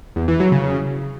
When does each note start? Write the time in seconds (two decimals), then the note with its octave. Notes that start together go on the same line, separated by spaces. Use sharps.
0.16 E2
0.28 E3
0.40 F#3
0.52 C#3